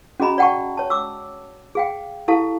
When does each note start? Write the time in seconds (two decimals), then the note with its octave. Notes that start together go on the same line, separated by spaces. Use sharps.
0.20 C#4 F#4 G#4 D#5 A#5 B5
0.38 D5 F#5 G5 A5 C#6
0.77 C#5 A5
0.90 D6 E6
1.75 G#4 F5 G5
2.28 E4 G4 A4 F5 A5